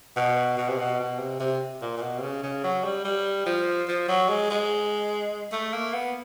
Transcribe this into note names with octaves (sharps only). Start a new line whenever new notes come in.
B2
B2
C3
B2
B2
C3
C3
A#2
A#2
B2
C3
C#3
C#3
F#3
G3
G3
F3
F3
F#3
G#3
G#3
A3
A#3
B3